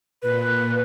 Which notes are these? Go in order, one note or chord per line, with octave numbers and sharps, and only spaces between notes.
A#2 B4